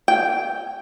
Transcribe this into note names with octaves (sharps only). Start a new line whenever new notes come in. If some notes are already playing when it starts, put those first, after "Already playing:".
G5